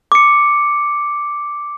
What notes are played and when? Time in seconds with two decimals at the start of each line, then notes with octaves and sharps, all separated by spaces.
0.12 D6 C#7